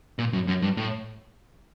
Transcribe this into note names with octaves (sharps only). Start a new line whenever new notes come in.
A#2
F#2
F#2
G2
A2